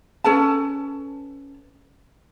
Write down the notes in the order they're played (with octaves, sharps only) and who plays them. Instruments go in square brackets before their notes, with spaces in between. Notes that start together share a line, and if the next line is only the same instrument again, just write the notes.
[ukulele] C#4 A4 B4 A5